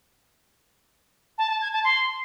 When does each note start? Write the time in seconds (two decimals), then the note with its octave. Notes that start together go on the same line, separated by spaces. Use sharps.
1.38 A5
1.50 A5
1.61 G#6
1.73 A5
1.84 C6